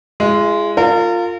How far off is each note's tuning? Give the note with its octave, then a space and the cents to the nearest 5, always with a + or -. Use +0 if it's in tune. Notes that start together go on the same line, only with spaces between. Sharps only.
G#3 +0 F4 -45
F4 +5 A#4 -35